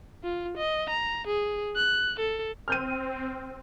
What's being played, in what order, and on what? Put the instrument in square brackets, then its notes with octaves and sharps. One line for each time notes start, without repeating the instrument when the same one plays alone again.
[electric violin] F4
D#5
A#5
G#4
F#6
A4
[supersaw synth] C4 [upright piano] F6 G6 D#7